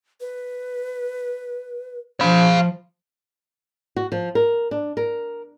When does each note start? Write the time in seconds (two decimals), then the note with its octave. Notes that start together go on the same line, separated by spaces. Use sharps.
0.20 B4
2.21 F3 F5 B5
3.97 F#4
4.12 F3
4.35 A#4
4.71 D4
4.97 A#4